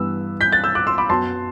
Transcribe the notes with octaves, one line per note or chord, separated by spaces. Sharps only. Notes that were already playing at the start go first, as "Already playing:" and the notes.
Already playing: G2 E3 B3 E6
G6 B6
F#6 A6
E6 G6
D6 F#6
C6 E6
B5 D6
F#2 F#3 B3 A5 C6